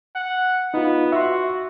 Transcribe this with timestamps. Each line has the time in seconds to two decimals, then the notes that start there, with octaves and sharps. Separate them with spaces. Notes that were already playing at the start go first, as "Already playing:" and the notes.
0.15 F#5
0.74 B3 D#4 F4
1.12 F#4 E5 C6